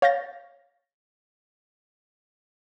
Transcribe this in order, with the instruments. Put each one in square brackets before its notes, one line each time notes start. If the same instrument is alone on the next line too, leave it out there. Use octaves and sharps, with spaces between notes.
[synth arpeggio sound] C#5 F5 G6 A6 A#6